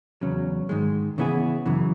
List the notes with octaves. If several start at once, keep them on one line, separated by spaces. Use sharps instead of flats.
E2 C#3 F#3 C#4
G#2 D#3 G#3
C#3 E3 B3 E4 G#4
F#2 C#3 E3